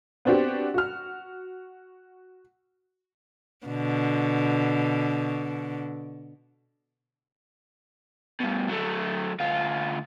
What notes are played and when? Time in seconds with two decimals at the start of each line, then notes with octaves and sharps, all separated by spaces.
0.25 B3 C4 D4 F#4 G4
0.74 F#4 F6
3.67 B2 D3
8.40 G2 B2
8.69 F#3 A3
9.40 D2 F4